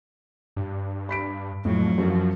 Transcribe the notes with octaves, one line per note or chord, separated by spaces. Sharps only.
G2
B5 B6 D7
F2 A2 F#3
F#2 F3